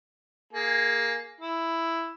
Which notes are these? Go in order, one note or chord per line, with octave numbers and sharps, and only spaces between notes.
A#3 G#4
E4